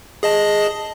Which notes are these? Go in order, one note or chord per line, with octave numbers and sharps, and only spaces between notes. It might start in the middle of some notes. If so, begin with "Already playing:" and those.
G#4 D#5 A5